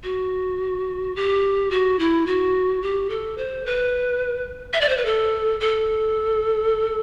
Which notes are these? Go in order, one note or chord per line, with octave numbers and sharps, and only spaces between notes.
F#4
G4
F#4
E4
F#4
G4
A4
C5
B4
E5
D5
C5
B4
A4
A4